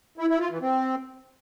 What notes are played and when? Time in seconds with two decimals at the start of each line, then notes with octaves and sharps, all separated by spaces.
0.18 E4
0.29 E4
0.39 F4
0.50 E3
0.61 C4